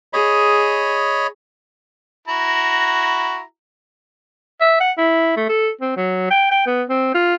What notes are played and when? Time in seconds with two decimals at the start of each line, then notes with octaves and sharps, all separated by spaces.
0.13 G#4 C#5 D#5 B5
2.28 E4 F#4 A#5
4.61 E5
4.80 F#5
4.98 E4
5.36 A3
5.49 A4
5.81 C4
5.97 F#3
6.30 G5
6.51 G5
6.66 B3
6.89 C4
7.14 F4